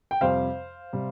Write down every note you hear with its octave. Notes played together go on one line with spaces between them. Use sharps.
G5
F2 C3 G3 C5 F5
C3 G3